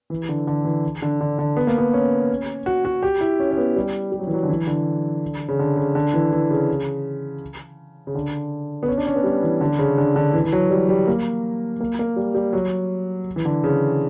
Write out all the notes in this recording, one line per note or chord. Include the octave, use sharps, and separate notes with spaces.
E3
D3
D3
E3
D3
D3
D3
B3
A#3
B3
C#4
F#4
F#4
G4
E4
C#4
C#4
B3
G3
G3
F#3
E3
F#3
D3
E3
D3
C#3
D3
C#3
D3
E3
E3
C#3
C#3
D3
B3
C#4
D4
C#4
B3
G3
E3
D3
C#3
D3
D3
E3
E3
F#3
G3
G3
A#3
A#3
A#3
G3
G3
F#3
E3
D3
C#3